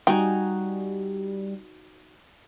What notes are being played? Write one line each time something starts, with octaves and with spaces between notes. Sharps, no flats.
G3 D#4 F#4 G5 G#5